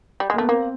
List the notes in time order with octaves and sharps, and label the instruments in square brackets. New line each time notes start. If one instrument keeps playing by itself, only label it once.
[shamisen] G3
G#3
[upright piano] A#3
[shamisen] A3 [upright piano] B3
[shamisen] A#3 [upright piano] C4